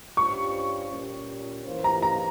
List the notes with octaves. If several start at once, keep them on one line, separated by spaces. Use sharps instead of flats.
G2 G3 C#4 F4 C5 C#6
A#2 G3 C#4
E3 A#3 F4 C5
A#5
A#5